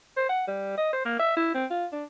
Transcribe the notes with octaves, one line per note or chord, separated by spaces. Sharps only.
C5
F#5
G3
D#5
C5
A#3
E5
E4
C4
F4
D4